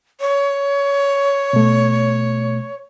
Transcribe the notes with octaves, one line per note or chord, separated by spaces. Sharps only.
C#5
B2 A3